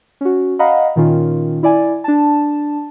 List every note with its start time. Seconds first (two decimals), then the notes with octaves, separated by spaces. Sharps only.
0.21 C#4 F#4
0.59 D#5 F5 F#5 A#5 B5
0.96 A#2 D#3 C#4 F4
1.63 E4 D5 G#5
2.04 D4 A5